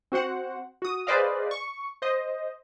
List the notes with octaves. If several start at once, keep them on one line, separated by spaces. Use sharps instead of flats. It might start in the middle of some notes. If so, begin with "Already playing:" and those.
C4 F#4 C5 F#5
F#4 D#6
G#4 B4 C5 D5 D#5 F5
C#6
C5 D#5